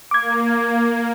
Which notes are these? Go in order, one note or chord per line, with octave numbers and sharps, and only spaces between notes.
A#3 D6 G#6